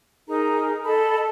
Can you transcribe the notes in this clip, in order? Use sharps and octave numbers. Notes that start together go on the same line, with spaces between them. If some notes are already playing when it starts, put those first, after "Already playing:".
D#4 G#4 A#4 A#5
A4 D#5 A5 B5